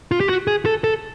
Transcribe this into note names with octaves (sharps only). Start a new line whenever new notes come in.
F4
G4
F#4
G#4
A4
A4